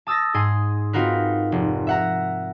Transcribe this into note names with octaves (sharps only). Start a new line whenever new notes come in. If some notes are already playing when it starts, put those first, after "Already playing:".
A5 D#6 E6 A6 A#6
G#2 G#4 C6 D#7
C4 D#4 F4 F#4 A#4 B4
F1
E5 F#5 A#5